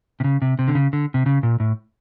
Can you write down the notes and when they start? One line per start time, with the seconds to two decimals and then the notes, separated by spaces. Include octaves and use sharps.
0.20 C3
0.24 C#3
0.42 C3
0.59 C3
0.68 D3
0.75 C#3
0.93 D3
1.14 C3
1.26 C#3
1.43 A#2
1.60 A2